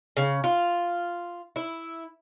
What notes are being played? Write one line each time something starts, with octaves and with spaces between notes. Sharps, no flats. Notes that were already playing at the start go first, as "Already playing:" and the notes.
C#3
F4
E4